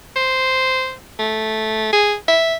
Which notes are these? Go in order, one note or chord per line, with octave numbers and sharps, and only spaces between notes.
C5
A3
G#4
E5